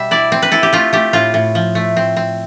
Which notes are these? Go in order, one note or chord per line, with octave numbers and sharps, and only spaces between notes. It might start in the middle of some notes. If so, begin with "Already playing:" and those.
Already playing: B2 G3 E5
E4 D5
C4
B4
E4 A4
G4
A3 F4
A3 G4
A2 F4
A2
F3
A3
C4
C4